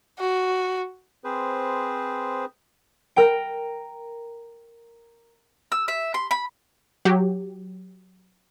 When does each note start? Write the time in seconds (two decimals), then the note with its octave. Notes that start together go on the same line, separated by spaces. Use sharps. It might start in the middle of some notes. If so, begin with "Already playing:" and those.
0.19 F#4
1.24 C4 G#4 B4 C5
3.16 A#4 G5
5.72 E6
5.88 E5
6.14 C6
6.31 B5
7.05 F#3 G4